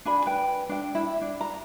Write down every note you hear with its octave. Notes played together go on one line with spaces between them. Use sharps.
D4 G#5 B5
B4 G5
D4 G5
E4
D4
A#5